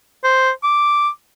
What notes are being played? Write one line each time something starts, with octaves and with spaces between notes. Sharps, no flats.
C5
D6